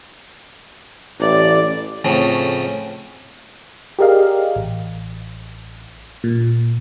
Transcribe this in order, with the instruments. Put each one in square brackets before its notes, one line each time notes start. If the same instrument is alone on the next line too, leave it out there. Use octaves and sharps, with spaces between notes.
[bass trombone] A1 [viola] D5
[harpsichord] F2 A2 C#3
[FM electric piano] G4 G#4 A#4 D5 D#5 F5
A1
A#2